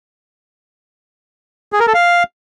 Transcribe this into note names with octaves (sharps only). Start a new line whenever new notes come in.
G#4
A#4
A4
F5